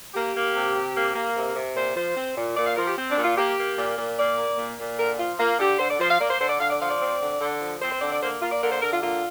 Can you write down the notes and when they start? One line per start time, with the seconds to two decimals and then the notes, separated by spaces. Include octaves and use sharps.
0.15 A#3 G4
0.35 A#3
0.56 C3
0.75 C3
0.96 A#3
1.15 A#3
1.36 C3
1.56 C3
1.76 A#2 C5
1.96 F3 C5
2.16 C4
2.37 A#2
2.57 A#2 D5
2.67 F5
2.76 F3 A#4
2.87 G4
2.97 C4
3.11 D4
3.17 A#2
3.24 F4
3.37 A#3 G4
3.58 A#3
3.78 A#2
3.98 A#2
4.18 A#3 D5
4.38 A#3
4.58 A#2
4.78 A#2
4.98 D3 A#4
5.18 F3 F4
5.39 A#3 F4
5.59 D3 G4
5.79 D3 C5
5.89 D5
6.00 F3 C5
6.10 F5
6.20 A#3 D5
6.30 C5
6.40 D3 C5
6.50 D5
6.60 D3 F5
6.70 D5
6.80 F3 F5
6.91 D5
7.01 C4
7.21 D3
7.40 D3
7.61 F3
7.81 C4 C5
7.91 C5
8.01 D3 D5
8.12 D5
8.21 A#3 C5
8.41 A#3 F4
8.52 D5
8.62 D3 A#4
8.72 C5
8.82 D3 A#4
8.92 F4
9.02 A#3 F4